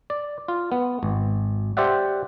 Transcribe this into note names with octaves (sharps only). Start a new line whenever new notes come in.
D5
F4
B3
G#1
G4 C5 D5 E5 F#5